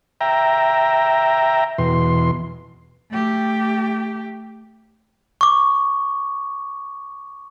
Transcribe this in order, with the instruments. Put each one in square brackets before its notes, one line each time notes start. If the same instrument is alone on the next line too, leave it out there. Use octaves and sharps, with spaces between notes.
[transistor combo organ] E5 G5 A#5
E2 B2 C6
[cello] A3 G4
[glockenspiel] C#6 D6